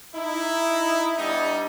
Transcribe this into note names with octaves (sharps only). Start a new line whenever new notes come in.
D#4 E4
G3 B3 D4 D#4